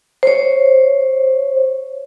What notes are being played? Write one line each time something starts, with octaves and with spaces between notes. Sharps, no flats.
C5 C#5